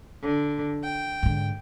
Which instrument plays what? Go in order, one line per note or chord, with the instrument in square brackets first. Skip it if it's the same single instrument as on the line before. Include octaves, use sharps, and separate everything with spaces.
[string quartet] D3
G5
[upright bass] G#2 D3